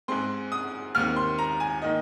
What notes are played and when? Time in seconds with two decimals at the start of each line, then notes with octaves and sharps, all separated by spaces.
0.08 G#2 G#3 C4 C6
0.52 D#6
0.95 D#2 D#3 C4 F6
1.16 C6
1.38 A#5
1.60 G#5
1.82 D#3 A#3 D#4 D#5